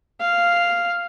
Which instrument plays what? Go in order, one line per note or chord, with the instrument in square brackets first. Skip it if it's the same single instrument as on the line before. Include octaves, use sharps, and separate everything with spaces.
[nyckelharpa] F5